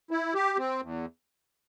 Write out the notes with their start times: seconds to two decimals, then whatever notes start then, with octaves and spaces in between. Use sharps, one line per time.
0.11 E4
0.34 G4
0.58 C4
0.82 E2